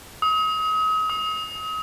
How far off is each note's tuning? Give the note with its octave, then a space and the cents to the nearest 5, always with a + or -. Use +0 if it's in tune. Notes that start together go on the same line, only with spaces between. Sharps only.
D#6 +35
D#6 +35